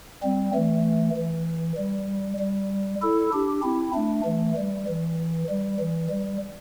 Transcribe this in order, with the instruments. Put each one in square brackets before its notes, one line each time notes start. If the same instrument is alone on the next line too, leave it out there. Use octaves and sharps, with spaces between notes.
[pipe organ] G3 C4
E3 A3
E3
G3
G3
E4 A4
D4 G4
C4 E4
A3 D4
E3 A3
G3
E3
G3
E3
G3